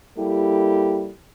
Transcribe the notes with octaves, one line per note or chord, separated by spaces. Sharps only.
G3 A#3 E4 G4 A4